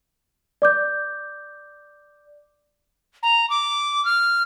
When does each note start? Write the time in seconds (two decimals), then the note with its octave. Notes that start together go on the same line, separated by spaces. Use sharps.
0.62 D5 D6 G6
3.23 A#5
3.50 D6
4.05 F6